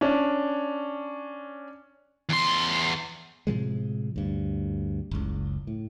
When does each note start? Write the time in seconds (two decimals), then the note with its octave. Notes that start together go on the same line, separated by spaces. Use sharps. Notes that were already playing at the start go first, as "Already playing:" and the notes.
0.01 C#4 D4
2.29 E2 C6
3.47 A2 C3 F3 G#3
4.16 D2 G2
5.11 F#1 C#2
5.67 A2